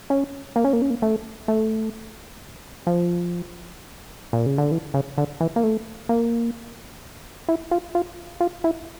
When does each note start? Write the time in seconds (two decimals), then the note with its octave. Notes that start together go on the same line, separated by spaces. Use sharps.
0.10 C#4
0.56 A#3
0.64 C#4
0.73 A#3
0.82 C#4
0.90 A#3
1.02 A3
1.48 A3
2.87 F3
4.33 A#2
4.46 C#3
4.58 D3
4.71 E3
4.94 C#3
5.18 D3
5.41 E3
5.56 A#3
5.63 A3
6.09 A#3
7.49 E4
7.71 F4
7.95 F4
8.40 F4
8.64 E4